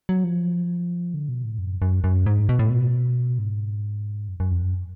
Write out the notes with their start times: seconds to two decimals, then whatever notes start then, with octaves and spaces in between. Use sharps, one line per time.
0.09 F#3
0.24 F3
1.14 D3
1.29 B2
1.44 A2
1.58 F#2
1.82 F#2
2.04 F#2
2.26 G#2
2.49 B2
2.59 A2
2.70 B2
3.39 G#2
4.29 F#2
4.40 F#2
4.51 F2
4.62 F#2